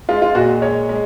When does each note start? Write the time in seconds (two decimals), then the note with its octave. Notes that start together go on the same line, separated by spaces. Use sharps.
0.09 G#3 F4
0.22 F4
0.35 A#2 F#4
0.62 G#3 C#5
0.89 G#3